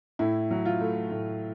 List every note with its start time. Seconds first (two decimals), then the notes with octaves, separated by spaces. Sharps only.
0.19 A2 E4
0.51 F#3
0.65 F4
0.81 A3
1.11 A2